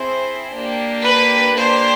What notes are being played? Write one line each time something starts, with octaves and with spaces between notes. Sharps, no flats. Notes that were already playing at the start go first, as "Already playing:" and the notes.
Already playing: C4 E4 G#4 C5
A#3 D4 G4
B4
A#3 D4 G4 C5